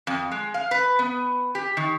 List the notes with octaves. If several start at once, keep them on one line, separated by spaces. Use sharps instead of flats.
F2
G#3
F5
B4
B3
G4
D#3